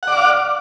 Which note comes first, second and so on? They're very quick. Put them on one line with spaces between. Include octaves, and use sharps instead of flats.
F#5 D5 D6 F5